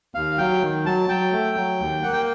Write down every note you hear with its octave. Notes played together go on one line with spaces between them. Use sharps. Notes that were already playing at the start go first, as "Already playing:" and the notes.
D#2 F5
F#3 G5
D#3
F#3 A5
F#3 G5
A3
F#3
D#2
A#3 F#5
G5